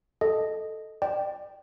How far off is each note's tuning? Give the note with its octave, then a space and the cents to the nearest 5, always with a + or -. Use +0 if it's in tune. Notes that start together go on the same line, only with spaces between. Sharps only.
A4 +0 D#5 +0
D5 +30 G5 -10